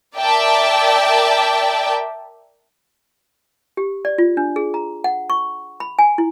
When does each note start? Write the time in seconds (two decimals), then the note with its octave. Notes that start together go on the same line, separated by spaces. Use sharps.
0.16 A#4 D5 E5 G5 A5
3.77 G4
4.05 D5
4.18 F4
4.37 D4
4.56 G#4
4.74 A#5
5.04 F#5
5.30 C#6
5.80 B5
5.99 G#5
6.18 E4